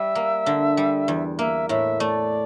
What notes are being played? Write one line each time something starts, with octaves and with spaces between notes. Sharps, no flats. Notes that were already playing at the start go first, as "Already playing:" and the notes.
Already playing: G3 E5
A#3
D3
G3
E2
A#3 E5
A2 E5
A3 D5